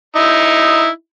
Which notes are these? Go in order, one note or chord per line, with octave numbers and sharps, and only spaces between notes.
D#4 E4